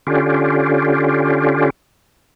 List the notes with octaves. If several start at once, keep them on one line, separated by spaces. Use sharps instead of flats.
D3 C#4 F4 G4